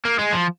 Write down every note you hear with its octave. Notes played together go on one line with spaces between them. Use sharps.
A#3
G#3
F3